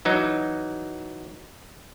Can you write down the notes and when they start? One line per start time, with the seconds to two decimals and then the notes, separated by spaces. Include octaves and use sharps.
0.05 E3 F#3 D#4